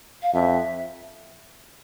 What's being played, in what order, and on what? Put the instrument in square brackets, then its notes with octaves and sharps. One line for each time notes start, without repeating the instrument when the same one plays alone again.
[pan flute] F5
[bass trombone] F2 [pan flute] E5